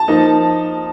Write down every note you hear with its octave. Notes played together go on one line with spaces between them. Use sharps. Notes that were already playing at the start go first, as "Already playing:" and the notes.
Already playing: A5
F3 A#3 D#4